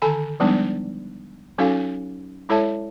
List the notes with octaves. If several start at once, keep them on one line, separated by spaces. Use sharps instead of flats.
D3 D#3 A4 G#5 B5
F3 G3 G#3 B3 D4 D#4
F#3 C#4 D#4 F#4 A4 F5
G#3 E4 A4 C#5 E5 A5